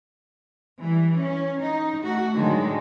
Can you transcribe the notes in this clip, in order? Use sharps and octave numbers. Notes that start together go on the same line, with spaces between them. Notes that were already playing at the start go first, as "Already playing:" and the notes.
E3 G3
C#4
D#4
A3 F#4
A2 D3 D#3 F#3 G#3